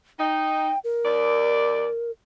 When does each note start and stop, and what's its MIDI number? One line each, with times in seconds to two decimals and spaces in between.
0.19 0.71 63
0.19 0.79 79
0.84 2.11 70
1.05 1.87 39
1.05 1.87 74